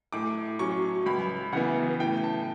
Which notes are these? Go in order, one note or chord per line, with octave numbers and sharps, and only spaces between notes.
A2 D6
F#3 C#4 C#6
C#2 B5
C#3 E3 B3 F#5
A2 G5
A5